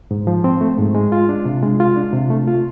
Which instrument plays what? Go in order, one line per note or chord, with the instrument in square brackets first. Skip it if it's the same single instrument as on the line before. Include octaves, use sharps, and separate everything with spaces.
[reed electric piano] G#2
F3
C4
A3
G#2
G#3
F4
D4
C3
G#3
F4
D4
C3
A3
F4